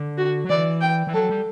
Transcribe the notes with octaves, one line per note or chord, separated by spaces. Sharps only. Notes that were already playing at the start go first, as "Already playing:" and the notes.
Already playing: D3
F#4
F#3
E3 D5
G5
E3
F#3 A4
G3